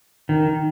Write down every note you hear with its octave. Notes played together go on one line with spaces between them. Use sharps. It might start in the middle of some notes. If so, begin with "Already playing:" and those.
D#3